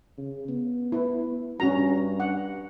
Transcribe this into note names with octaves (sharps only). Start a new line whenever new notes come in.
C#3
B3
E4 B4
G2 C#4 F#4 A#5
F#5